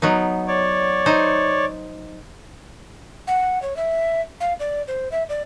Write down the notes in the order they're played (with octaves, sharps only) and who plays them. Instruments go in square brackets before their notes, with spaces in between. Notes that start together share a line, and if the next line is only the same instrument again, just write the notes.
[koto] F#3 B3 D#4
[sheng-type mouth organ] C#5 D5
[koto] D#4 C5
[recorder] F#5
C#5
E5
F5
D5
C5
E5
D5